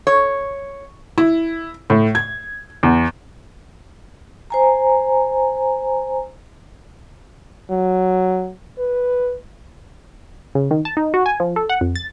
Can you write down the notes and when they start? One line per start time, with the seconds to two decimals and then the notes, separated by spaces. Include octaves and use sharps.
0.07 C#5
1.18 E4
1.90 A2
2.15 G#6
2.83 E2
4.50 C5 G#5 A#5
7.70 F#3
8.79 B4
10.55 C#3
10.71 D#3
10.85 A5
10.97 D#4
11.14 F#4
11.26 G#5
11.40 F3
11.56 A4
11.69 F#5
11.81 F2
11.96 A6